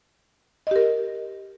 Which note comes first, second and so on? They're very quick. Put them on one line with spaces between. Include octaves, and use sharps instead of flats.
D#5 G4 A#4